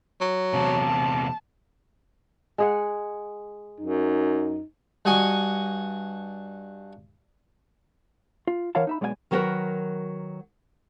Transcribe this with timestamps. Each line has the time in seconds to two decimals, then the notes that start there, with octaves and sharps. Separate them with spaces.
0.21 F#3
0.54 E2 C3 A5
2.58 G#3 G#4 F#5
3.80 F#2 D#4
5.05 G2 F#4 D#5 G#5 C#6
8.47 F4
8.75 E3 A#4 C#5 F5 F#5 A5
8.87 D#4 E5 B5
9.01 B1 G#3 B3 D5 F5 G#5
9.31 D#3 F#3 F#4 G#4 A#4 B4